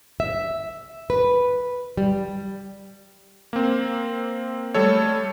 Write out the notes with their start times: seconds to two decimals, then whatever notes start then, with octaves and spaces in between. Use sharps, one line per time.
0.20 E5
1.10 B4
1.97 G3
3.53 A#3 C4
4.74 G3 A3 A4 C#5